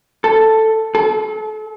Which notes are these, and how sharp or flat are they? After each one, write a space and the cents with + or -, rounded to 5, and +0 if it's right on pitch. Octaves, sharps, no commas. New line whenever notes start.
A4 +5
A4 -35